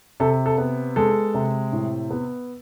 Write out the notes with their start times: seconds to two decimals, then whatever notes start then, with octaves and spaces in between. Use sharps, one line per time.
0.20 C3 A4
0.46 A4
0.58 B3
0.96 G#3 A4
1.34 C3
1.73 A2
2.11 B3